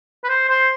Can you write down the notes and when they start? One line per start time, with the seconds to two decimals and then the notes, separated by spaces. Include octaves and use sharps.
0.24 B4
0.28 C5
0.49 C5